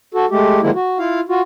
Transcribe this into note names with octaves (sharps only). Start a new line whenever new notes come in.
F#4 A4
G#3 A3 G4
D3 D#3 F3 G#3 A#3 E4
F#4
E4 F4 F5
F4 F#4